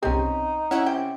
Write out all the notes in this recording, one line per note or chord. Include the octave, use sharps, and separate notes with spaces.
C2 B2 C4 C#4 D#4 G4
C#4 E4 F#5
C3 G5